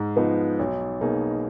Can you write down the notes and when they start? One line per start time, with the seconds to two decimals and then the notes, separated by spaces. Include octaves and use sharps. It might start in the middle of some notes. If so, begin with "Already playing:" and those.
Already playing: G#2
0.16 F3 B3 D#4
0.59 B1
1.01 B2 A#3 D#4 G#4